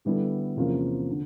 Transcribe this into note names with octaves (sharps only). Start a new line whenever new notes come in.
D3 G3 B3 E4 A4
E2 C3 F3 A#3 C#4
D3